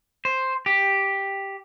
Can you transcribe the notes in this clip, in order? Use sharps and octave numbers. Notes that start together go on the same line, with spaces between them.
C5
G4